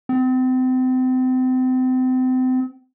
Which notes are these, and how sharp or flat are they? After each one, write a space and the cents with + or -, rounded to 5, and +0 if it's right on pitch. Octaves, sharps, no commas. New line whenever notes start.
C4 -35